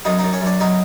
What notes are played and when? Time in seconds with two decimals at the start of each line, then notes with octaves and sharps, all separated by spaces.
0.05 F#2 D#4
0.19 F#2 D#4
0.33 C#4
0.41 F#2 D4
0.60 F#3 D#4